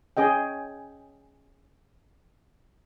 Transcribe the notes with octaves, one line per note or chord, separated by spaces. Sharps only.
C#4 G#4 D#5 G5